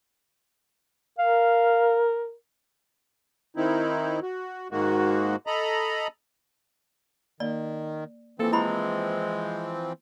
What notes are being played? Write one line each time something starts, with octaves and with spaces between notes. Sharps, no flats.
A#4 F5
D#3 C4 D#4 E4
F#4
G#2 D#3 G#3 A#3 F#4
A4 D#5 A#5 B5
D#3 A#3 D5
E3 F3 A#3 C4 A4
G#3 E4 G4 B5